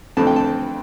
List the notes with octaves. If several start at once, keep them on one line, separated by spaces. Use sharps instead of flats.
F2 D3 A3 C4 A5
G5
A5